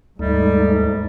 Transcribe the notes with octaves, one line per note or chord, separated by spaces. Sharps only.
D#2 G#2 G3 A3 D#4